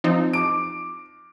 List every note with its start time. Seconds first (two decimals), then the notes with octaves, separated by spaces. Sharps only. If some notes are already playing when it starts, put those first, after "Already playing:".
0.04 F3 C4 D#4
0.33 D6 D7